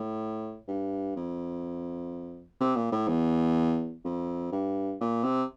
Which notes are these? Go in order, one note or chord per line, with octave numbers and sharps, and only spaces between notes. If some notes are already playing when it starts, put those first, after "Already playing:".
Already playing: A2
G2
F2
C3
A#2
A2
E2
F2
G2
A#2
C3